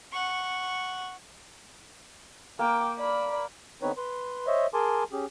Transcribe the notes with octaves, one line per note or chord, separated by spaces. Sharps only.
F#5 C#6
A#3 G5 D6
D5 B5
D3 B3 C4 D#4 B4 C#5
B4 C6
C5 C#5 D#5 E5
G#4 A#4 G#5 A5 C6 D6
C#4 G4 G#4